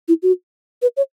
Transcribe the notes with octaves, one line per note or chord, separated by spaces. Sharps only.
E4
F#4
B4
C#5